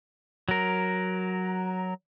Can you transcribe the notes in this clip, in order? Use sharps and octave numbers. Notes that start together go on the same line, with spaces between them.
F#3 A#4